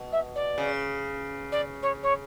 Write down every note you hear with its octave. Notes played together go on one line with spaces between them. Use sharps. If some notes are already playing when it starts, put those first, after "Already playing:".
Already playing: B2
E5
D5
C#3
D5
C#5
C#5